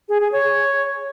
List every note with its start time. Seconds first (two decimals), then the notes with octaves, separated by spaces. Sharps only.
0.09 G#4
0.20 G#4
0.32 C#5